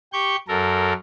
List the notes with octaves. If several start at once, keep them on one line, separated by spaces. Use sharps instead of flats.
G4 C#6 G6
F#2 A4 A#4